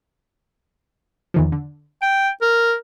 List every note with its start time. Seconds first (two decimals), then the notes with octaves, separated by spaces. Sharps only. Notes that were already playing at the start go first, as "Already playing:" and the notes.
1.34 E2 D#3 F3
1.52 D3
2.02 G5 D7
2.41 A#4